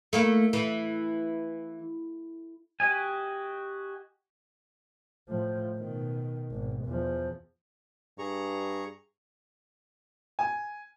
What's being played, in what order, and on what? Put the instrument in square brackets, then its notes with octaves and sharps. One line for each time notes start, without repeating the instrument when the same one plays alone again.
[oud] A3 A#3 E4
E3
[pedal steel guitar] F#4 G4 D#5 G#5
[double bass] A2 F3
B2 D#3
G#1 B2
E2 F3
[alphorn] G2 [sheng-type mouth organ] G#4 A#5 C#6
[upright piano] G#5